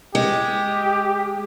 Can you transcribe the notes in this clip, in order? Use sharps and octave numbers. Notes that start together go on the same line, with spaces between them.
G#3 G4